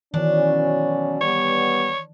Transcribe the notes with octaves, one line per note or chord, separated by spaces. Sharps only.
B2 D#3 E3 F#3 C#4 D4
G3 B3 C#5